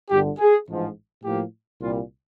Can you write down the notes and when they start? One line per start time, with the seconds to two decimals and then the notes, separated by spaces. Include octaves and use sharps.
0.10 G1 G2 D3 G4
0.39 G#4
0.68 A1 G#2 F3
1.24 A2 F3 A#3 G4
1.80 C2 A#2 G3 F4